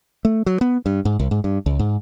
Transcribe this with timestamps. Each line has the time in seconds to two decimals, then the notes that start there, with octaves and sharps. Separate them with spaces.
0.25 A3
0.46 F#3
0.61 B3
0.86 G2
1.05 G#2
1.19 C2
1.31 G#2
1.44 G2
1.66 C#2
1.79 G#2